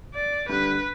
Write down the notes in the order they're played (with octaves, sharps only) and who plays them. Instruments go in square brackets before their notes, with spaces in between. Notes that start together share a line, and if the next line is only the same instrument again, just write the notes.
[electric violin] D5
[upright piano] D3 G3 D4 [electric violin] B4